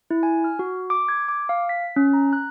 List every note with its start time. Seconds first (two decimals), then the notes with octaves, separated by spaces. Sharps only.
0.11 E4
0.23 G#5
0.44 F6
0.59 F#4
0.90 D6
1.09 G#6
1.28 D6
1.49 F5
1.69 B6
1.96 C#4
2.13 A#5
2.33 F#6